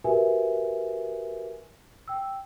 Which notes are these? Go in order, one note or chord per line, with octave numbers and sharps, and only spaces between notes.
F#4 G4 A#4 B4 E5 G#5
G5 E6